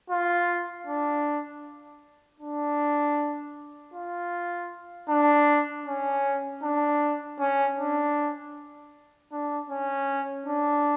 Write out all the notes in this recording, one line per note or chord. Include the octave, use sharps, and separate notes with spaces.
F4
D4
D4
F4
D4
C#4
D4
C#4
D4
D4
C#4
D4